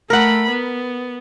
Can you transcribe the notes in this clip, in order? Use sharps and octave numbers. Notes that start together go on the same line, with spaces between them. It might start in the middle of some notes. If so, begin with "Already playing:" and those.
A3 A#4 F#5 B5
B3